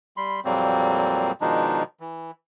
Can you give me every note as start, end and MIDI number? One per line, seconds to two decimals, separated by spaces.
0.17 0.40 55
0.17 0.40 83
0.17 0.40 84
0.45 1.32 41
0.45 1.32 46
0.45 1.32 54
0.45 1.32 55
0.45 1.32 58
0.45 1.32 60
1.41 1.83 47
1.41 1.83 51
1.41 1.83 53
1.41 1.83 56
1.41 1.83 62
1.41 1.83 63
2.00 2.31 52